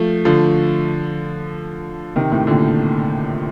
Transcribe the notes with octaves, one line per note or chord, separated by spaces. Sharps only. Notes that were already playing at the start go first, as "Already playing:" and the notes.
Already playing: F3 A3
D3 F3
C3 D#3
A2 C3
A#2 D3